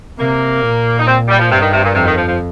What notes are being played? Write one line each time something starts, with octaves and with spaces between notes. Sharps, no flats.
C3 A#3
A#2
D#4
C4
G3
F3
G2 C3
D#3
C3
A#2
F2 C3
D#3
F3
F3